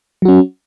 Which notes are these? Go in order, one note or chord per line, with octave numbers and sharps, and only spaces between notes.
F#3 C#4 F#4